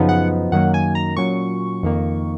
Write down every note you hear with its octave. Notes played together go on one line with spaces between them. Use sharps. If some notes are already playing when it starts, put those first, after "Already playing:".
Already playing: F#2 C#3 F3 B3 D#4
F#5
F#2 D#3 F#3 A#3 F#5
G#5
A#5
A#2 F#3 C#4 C#6
F2 D#3 A#3